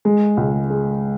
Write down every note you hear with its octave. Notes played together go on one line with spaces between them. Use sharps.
G#3
C#2
G#3